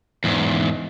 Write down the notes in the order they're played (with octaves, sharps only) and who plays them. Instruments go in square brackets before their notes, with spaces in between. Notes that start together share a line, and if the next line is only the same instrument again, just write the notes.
[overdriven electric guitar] E2 G#2